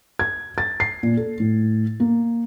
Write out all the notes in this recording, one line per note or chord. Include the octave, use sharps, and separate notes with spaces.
G#6
A6
C7
A#2
A4
A2
A#3